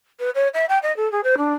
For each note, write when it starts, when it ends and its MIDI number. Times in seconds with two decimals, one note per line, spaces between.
0.20 0.30 71
0.35 0.48 73
0.54 0.66 76
0.69 0.79 79
0.83 0.95 75
0.97 1.11 69
1.12 1.21 68
1.24 1.35 72
1.38 1.53 62